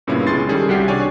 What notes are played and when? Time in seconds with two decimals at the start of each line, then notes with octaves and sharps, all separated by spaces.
0.07 G2 A#2 C#3 B3 C#4 E4
0.26 C#2 G#4 C6 A6 C7
0.49 D#3 G3 C#4 G#4 A4
0.69 C2 G3 F#4 G4 C7
0.88 D4 C#5 D5 G#5